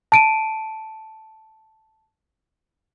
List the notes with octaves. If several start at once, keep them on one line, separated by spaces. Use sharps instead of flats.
A5 D7 D#7